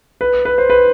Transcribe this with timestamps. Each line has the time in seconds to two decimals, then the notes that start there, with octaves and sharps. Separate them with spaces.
0.21 B4
0.45 B4
0.58 C5
0.70 B4